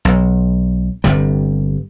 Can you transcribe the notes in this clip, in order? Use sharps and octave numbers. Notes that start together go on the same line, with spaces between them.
B1
G1 C3 G3